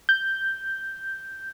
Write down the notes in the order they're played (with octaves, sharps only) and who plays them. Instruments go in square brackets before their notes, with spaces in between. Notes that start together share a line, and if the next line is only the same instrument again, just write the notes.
[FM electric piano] G6